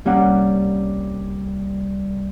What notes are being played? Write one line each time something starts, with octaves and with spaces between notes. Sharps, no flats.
C2 G3 A#3 C#4 F#5